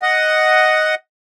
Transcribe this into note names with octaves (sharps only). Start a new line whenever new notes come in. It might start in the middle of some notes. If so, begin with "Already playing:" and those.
D#5 F#5